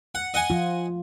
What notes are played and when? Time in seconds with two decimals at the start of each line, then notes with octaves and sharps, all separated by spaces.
0.15 F#5
0.34 D#5 F#5 G#5
0.50 F3 F4